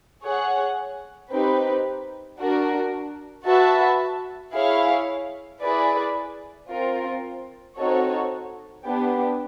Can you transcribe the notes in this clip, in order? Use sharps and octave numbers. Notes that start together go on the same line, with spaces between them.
G#4 C#5 F#5
C4 D#4 G4 B4
D4 F#4 A#4
F#4 B4 E5 A5
E4 G#4 C#5 F5
E4 G#4 B4 D5
C4 F4 A#4
C4 D#4 F#4 A4 C#5
B3 D4 G4